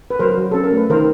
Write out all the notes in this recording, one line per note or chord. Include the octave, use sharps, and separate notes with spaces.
B4
F#3 A#4 C5
F#3
C#4 A4
A#4
A3 B4
D#3 A#4 C5